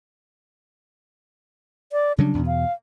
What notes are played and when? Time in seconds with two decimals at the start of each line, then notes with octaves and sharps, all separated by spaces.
1.92 D5
2.18 C#3 F#3 G3 D4
2.34 E2 B2
2.46 F5